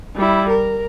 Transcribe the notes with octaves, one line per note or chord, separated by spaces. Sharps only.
G3 E4
A#4